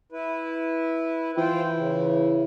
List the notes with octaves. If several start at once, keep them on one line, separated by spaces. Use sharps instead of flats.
E4 B4
E3 F4 C5 G5
C#3